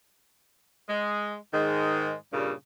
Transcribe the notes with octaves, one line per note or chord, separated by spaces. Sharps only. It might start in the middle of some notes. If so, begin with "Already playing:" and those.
G#3
G#2 D#3 G#3
G2 A#2 C#3 G3